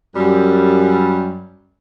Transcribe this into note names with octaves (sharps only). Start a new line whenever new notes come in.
F#2 G3